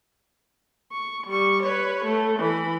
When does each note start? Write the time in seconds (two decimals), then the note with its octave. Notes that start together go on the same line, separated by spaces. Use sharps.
0.92 C#6
1.27 G3 C#6
1.64 B4 C#5
2.05 A3
2.39 E3 B5